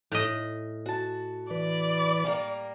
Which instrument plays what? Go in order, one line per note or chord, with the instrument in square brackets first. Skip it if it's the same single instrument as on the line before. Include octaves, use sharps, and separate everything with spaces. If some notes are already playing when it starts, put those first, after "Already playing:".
[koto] A2 D#5
[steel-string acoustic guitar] F#4 A5
[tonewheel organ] E3 B4 [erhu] D5
[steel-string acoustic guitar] G3 A#3 A#4